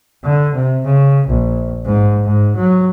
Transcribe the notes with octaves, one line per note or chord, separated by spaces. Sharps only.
D3
C3
C#3
A#1
G#2
G#2
F#3